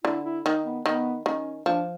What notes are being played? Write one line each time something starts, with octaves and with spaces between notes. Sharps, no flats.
D3 E4
E4
D#3 D#4
B3
D#3 B3
D#3 C#4
F3 D4